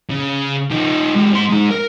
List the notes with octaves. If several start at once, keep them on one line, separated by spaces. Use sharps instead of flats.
C#3
F3 D#4
G#3 G4
G#2 C6
G#3 D#4
A#4